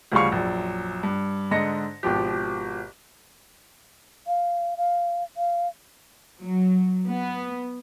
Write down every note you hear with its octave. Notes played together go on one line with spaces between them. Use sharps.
D2 C#3 F3 G3 F5 C#6
A#1 F#2
G2
G#2 D3 D#5 A#6 C#7
G#1 B2 F3 G4
F5
F5
F5
F#3
B3